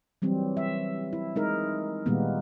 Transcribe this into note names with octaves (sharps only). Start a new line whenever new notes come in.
E3 F#3 G3 C4
E5
E4
G#3 D#4 A#4
A#2 D#3 G3 G#3 A#3 B3